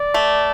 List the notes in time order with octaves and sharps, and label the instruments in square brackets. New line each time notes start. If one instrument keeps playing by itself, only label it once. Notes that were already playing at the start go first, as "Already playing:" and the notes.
Already playing: [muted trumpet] D5
[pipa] A3